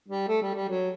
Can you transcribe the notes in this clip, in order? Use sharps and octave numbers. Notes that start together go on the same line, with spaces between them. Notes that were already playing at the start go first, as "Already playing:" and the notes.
G3
A3
G3
G3
F#3